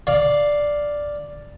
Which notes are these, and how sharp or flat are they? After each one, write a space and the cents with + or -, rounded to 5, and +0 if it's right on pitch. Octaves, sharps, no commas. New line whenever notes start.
D5 +0 F5 +0